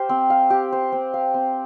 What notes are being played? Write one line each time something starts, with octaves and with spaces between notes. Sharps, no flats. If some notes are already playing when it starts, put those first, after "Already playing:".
Already playing: G4 C5 F5
C4
F5
G4
C5
C4
F5
C4